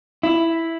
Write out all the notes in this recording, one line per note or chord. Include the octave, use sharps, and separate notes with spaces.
E4